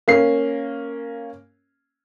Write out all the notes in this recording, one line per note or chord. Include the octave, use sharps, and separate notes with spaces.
A#3 C#4 C7